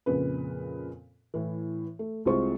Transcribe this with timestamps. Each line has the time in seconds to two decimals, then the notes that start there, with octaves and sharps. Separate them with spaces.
0.06 F2 A#2 C#3 B4
1.34 A2 E3
1.99 A3
2.25 C2 C3 G#3 F4 C5 C#6